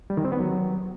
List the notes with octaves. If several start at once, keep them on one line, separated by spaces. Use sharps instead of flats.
G3
D#3
C4
B3
F#3